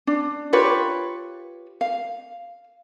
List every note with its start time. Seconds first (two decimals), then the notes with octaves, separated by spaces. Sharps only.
0.07 D4
0.53 F4 G4 B4 C#5
1.81 F5